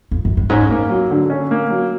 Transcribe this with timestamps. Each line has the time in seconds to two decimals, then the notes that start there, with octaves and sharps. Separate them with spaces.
0.11 F2
0.25 F#2
0.37 G2
0.49 G#2 C#4
0.71 A#3
0.90 F#3
1.11 D3
1.30 C#4
1.51 A#3
1.70 F#3